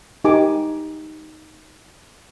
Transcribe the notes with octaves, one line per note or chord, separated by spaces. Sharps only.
D#4 G4 A#4 G#5 D6